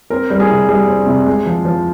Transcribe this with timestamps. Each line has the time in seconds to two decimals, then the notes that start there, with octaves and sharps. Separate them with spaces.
0.10 C4 A#4
0.30 G3
0.40 G#4
0.49 C3
0.68 G3 G#4
0.88 C4
1.07 C3
1.26 G#3
1.46 F3
1.65 F3